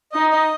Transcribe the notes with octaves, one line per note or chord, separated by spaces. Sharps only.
D#4 D#5
D#5